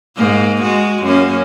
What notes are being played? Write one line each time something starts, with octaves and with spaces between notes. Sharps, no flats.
G#2 A#3
G#3 F#4
F#2 A#3 C#4